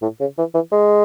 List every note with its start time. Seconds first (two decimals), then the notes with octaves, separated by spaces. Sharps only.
0.02 A2
0.21 C#3
0.38 E3
0.54 E3
0.72 G#3